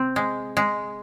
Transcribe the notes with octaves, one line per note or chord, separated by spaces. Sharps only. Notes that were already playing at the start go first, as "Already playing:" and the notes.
Already playing: C3 C4
G#3
G#3